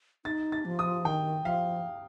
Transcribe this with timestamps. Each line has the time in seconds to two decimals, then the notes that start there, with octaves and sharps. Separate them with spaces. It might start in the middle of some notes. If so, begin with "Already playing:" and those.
0.25 D#4 A6
0.52 A6
0.65 F3
0.79 D#6
1.05 D#3 G5
1.44 F3 F5